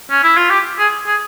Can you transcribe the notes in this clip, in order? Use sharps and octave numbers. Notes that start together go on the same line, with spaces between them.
C#4
E4
F4
G4
G#4
G#4